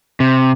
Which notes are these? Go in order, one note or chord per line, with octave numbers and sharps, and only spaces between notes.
C3